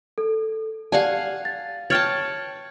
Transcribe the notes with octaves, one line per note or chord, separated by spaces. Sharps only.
A4
G4 D5 F5 F#5 G#5 A5
A6
C#5 G5 A5 F6 A6 F#7